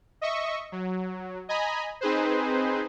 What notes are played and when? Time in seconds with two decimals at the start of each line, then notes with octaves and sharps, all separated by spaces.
0.21 D#5 E5 C#6
0.72 F#3
1.49 D#5 G#5 A#5 B5
2.01 C4 D#4 G#4 B4 C5